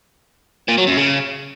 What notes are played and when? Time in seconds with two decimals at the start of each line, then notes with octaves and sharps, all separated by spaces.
0.68 A#2
0.78 F#3
0.88 F#2
0.97 C#3